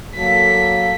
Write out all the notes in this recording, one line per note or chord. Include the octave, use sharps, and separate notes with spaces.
F#3 A#3 A4 B6